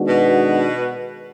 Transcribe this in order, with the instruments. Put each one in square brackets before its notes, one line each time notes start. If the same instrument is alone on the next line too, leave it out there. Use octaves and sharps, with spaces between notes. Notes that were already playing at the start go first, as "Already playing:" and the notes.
Already playing: [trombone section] D#3 G#3 B3 D4 F#4
[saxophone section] B2